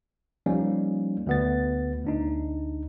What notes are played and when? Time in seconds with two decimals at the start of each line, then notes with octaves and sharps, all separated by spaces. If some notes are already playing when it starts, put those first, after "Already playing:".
0.46 F3 G3 A#3 C#4 D#4
1.27 D2 B3 A6
2.05 D2 D4 D#4